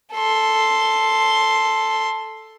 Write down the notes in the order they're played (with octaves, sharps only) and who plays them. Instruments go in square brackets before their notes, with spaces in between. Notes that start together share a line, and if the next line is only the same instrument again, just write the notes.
[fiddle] A4 C6